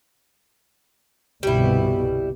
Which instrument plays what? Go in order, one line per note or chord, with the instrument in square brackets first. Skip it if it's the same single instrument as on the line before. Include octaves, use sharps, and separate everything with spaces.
[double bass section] G1 C2 B2 [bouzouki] G3 E4